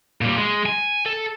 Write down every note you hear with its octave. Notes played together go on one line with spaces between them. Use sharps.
A#2 G3
G#3
G#5
A4